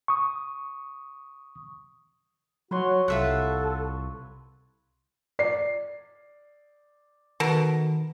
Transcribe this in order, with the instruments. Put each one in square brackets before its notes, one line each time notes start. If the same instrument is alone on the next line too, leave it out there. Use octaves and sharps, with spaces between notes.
[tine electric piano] C#6 D#6
[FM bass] F#3 [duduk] F#4 [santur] B4 C#5 C6
[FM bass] C2 [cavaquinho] F4 E5 F#5 [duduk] A4
[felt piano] D5 C7
[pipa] B2 A4 A#4 [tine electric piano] D#3